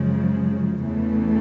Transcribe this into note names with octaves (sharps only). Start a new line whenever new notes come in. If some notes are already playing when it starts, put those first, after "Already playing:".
Already playing: F#2 C#3 F3 G#3
E2 C#3 E3 A3